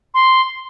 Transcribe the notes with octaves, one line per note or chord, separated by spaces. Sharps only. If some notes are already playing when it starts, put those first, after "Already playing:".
C6